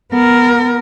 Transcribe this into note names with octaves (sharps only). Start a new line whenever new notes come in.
B3 A#4